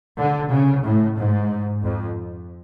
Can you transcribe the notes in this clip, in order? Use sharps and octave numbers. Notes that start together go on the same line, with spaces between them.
D3
C#3
A2
G#2
F2